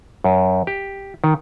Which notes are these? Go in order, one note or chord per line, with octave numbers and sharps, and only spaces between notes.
F#2
G4
D#3